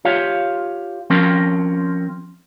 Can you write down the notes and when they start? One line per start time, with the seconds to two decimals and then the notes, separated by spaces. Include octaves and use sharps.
0.05 F4 G4 C#5 F5
1.10 F3 C4 C#4 A#4